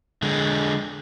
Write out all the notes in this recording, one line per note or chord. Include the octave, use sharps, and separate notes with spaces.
D3 G#3